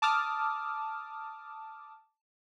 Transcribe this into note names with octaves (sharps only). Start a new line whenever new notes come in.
A5 D6 D#6 F6